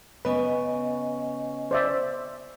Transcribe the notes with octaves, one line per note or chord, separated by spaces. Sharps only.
C#3 B3 B4 D#5 G#5 C#6
C5 D5 E5